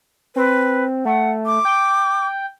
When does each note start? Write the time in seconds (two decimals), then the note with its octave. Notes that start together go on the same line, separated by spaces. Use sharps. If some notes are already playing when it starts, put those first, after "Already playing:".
0.36 C4 B4
1.05 A3 F#5
1.46 D6
1.65 G5